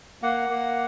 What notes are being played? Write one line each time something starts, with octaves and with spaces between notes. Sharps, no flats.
A#3 F#5
A#3